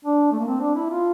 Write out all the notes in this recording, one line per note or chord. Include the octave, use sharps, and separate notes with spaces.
D4
A3
A#3
C4
D4
E4
F4